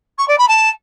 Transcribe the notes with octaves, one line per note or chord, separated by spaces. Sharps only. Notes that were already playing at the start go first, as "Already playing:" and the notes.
C#6
D5
B5
A5